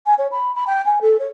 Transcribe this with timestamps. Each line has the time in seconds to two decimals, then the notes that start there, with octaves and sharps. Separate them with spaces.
0.06 G#5
0.18 C#5
0.32 B5
0.55 B5
0.67 G5
0.86 G#5
1.01 A4
1.19 C#5